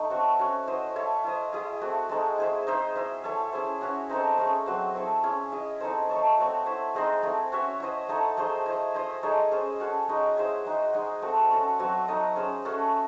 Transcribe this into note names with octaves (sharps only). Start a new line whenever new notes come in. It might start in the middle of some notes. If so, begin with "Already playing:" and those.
Already playing: A3 D#4
C4 F#4 A4 C#5
C#4 F#4 C#5
E4 C5 D#5
E4 A4 C#5
E4 C5 D#5
E4 G#4 D#5
A3 C4 F#4
G#3 C4 D#4 A4
E4 G#4 C5 E5
D#4 G#4 C5 E5
E4 C5 E5
E4 A4 C#5 E5
C#4 E4 G#4 C5
C#4 F#4 C#5 E5
C4 D#4 A4 C5
A3 C#4 G#4
F#3 C4 F#4 C5
C4 E4 A4
C#4 E4 G#4
E4 G#4 D#5
C4 D#4 A4 C5
A3 D#4 A4 C#5
A3 C4 F#4 C#5
E4 C5 E5
G#3 C4 D#4
A3 C4 E4
C#4 F#4 C#5 E5
E4 C5 D#5
A3 D#4 A4
A3 D#4 G#4 C5
E4 C5 D#5
E4 C5 D#5
G#3 D#4 A4 C#5
C#4 G#4 C5
C#4 F#4 A4
G#3 D#4 F#4 C#5
E4 G#4 C5 E5
G#3 D#4 F#4
G#3 D#4 G#4
A3 C4 F#4 A4
C#4 F#4 A4
F#3 C4 F#4 C#5
D#4 A4 D#5
C#4 G#4 C5
A3 C#4 F#4 A4